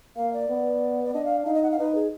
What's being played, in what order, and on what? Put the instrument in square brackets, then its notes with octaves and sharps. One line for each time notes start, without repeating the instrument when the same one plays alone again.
[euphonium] A#3 [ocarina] F5
[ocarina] D5
[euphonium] B3
[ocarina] D5
[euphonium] D4 [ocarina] D#5
[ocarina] F5
[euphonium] D#4 [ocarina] F5
[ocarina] D#5
F#5
F5
[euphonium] D#4 [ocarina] B4
[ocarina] G#4